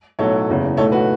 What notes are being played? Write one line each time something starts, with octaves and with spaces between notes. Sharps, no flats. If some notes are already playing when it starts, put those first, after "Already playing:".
B1 A2 F#3 A4 C#5
F#1 E2 C#3
B1 A2 A3 A4 C#5
F#4 B4